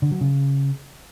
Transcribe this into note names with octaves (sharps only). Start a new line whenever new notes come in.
D3
F#3
C#3